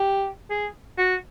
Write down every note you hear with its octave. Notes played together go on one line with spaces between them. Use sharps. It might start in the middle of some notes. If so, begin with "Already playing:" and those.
Already playing: G4
G#4
F#4